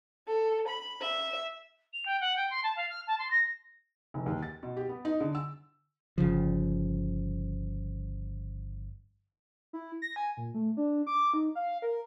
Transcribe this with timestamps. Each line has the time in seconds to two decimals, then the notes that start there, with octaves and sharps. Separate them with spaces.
0.27 A4
0.68 B5
1.02 E5
1.93 F7
2.05 G5
2.20 F#5
2.36 G5
2.50 C6
2.63 A5
2.76 F5
2.89 F6
3.07 A5
3.18 C6
3.30 A#6
4.14 F1
4.26 D#2
4.43 A6
4.63 B2
4.77 G4
4.89 B3
5.05 D#4
5.20 D3
5.35 E6
6.18 G1 C#2 C#3 F3
9.73 E4
10.02 A#6
10.16 G#5
10.37 A#2
10.54 A3
10.77 D4
11.07 D6
11.34 D#4
11.55 F5
11.82 A#4